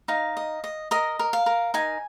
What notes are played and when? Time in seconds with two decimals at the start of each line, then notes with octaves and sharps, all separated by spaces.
0.08 D#4 F5
0.37 D#5
0.64 D#5
0.91 A#4 D#5
1.19 A#4
1.33 F5
1.46 A#4
1.74 D#4 G#5